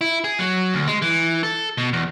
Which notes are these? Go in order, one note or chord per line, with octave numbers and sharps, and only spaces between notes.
E4
G#4
F#3
D2
G#3
E3
A4
B2
E2